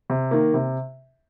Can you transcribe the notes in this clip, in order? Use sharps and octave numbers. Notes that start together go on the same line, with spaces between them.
C3
D#3 A#3
C3